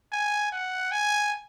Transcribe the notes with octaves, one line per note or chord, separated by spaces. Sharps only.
G#5
F#5
G#5